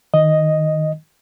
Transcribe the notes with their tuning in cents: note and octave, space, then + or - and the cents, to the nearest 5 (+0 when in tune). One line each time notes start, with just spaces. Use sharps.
D#3 +0 D#5 +0